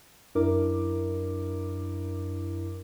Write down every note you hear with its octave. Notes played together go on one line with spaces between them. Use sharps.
F#2 D4 E4 A#4 D6